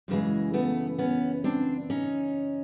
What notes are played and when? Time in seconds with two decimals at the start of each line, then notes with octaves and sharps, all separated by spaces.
0.08 F#2 C#3 E3 G#3
0.53 A3 B3
0.99 B3 C#4
1.44 C4 D4
1.90 C#4 D#4